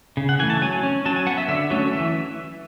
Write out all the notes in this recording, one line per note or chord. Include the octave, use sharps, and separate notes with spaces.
C#3
F#5
E3 A3 G#5
A5
F#3 G#5
C#4
F#3 A5
G#5
B3 F#5
E5
D3 E5
F#3 A3 C#4
E3 E5